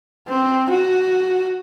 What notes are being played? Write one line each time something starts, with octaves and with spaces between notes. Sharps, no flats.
C4
F#4